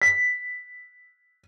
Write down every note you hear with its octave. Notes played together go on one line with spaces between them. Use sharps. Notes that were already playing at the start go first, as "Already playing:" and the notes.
B6